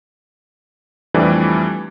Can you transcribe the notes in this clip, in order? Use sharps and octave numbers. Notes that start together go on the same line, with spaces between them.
F2 E3 G3 A3 D4